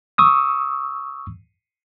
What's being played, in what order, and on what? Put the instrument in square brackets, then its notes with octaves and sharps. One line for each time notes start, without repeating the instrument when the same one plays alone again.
[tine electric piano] C#6 D#6 E6